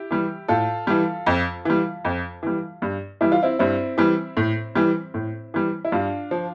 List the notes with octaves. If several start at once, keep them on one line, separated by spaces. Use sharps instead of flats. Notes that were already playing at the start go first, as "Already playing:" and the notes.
Already playing: E4 G4
E3 G3
A2 F4 A4
E3 G3
F2
E3 G3
F2
E3 G3
G2
E3 G3 E4
F4
C4 E4
G2 C4 E4
E3 G3
A2
E3 G3
A2
E3 G3
E4
G2 D4 F4
F3